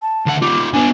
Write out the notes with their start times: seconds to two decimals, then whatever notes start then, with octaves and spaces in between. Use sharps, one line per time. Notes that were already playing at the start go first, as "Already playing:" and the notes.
0.02 A5
0.26 D2 F#5
0.42 D#4 F4 D6
0.73 D3 B3 G#5